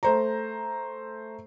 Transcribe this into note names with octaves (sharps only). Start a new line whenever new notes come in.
A3 C5 A#5